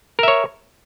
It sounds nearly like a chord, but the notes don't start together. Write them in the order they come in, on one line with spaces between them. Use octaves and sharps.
A#4 E5 C#5